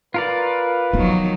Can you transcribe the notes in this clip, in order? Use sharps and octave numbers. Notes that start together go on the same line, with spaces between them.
F4 A#4 B4 D5
D#3 F3 F#3 B3